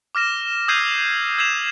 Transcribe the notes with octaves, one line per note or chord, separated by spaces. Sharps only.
D6 F6 A#6 E7
D#6 E6 G6 G#6 C7 D#7
E6 G#6 B6 C7 E7 F7